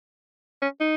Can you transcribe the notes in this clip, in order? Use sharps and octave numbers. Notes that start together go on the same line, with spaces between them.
C#4
D#4